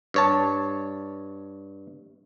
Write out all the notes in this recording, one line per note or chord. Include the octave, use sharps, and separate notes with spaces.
G2 C#5 A5